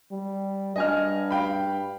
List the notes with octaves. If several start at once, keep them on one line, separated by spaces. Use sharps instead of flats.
G3
G2 D#5 G#5 F6
F5 G5 B5